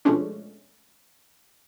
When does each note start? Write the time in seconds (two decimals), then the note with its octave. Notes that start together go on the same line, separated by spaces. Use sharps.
0.05 B2 F3 G#3 A3 C#4 D4